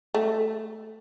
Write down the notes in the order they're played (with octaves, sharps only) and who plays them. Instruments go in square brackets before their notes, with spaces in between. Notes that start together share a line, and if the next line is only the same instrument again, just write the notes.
[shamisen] A3